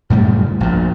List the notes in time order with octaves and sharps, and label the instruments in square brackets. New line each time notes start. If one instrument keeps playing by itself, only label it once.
[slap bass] F#2 A2 C#3 G3
A#1 A#2